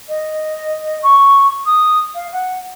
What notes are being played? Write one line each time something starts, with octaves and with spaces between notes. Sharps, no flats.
D#5
C#6
D#6
F5
F#5